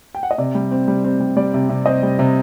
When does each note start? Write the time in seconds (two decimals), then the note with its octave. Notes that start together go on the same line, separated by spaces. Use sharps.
0.15 G5
0.23 F#5
0.31 D#5
0.38 C3 D5
0.55 G3
0.71 C4
0.88 G3
1.04 C4
1.20 G3
1.36 G3 D5
1.54 C3
1.69 C3
1.86 C4 D#5
2.03 G3
2.19 C3